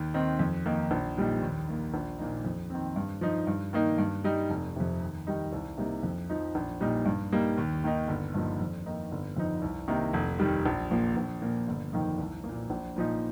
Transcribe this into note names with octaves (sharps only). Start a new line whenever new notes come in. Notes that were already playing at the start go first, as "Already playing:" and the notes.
Already playing: D#2
D#3 C4 D#4
F2
D#3 A#3 D#4
A#1
A#2 G3 D#4
D#2
D#3 A#3
A#1
A#2 A#3 D#4
F2
D#3 C4
G2
F3 D#4
G2
D#3 A#3 D#4
G2
G3 D#4
F1
F2 C3
D#2
D#3 G3 D#4
C2
C3 G3 A#3 D#4
F2
F3 D#4
A#1
A#2 G3 D#4
G2
G3 A#3 D#4
D#2
D#3 A#3 D#4
G1
G2 F3 A#3 D#4
F2
D#3 A#3 D#4
G1
F2 F3 D#4
C2
C3 D#3 A#3 D#4
F1
D#2 D#3 G3
A#1
A#2 F3 A#3
A#1
A#2 A#3
G1
F2 D#3 A#3 D#4
C2
A#2 A#3
A#1
A#2 F3 D#4